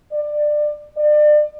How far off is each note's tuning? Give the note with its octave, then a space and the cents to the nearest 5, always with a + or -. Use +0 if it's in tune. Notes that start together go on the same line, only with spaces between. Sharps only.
D5 +20
D5 +35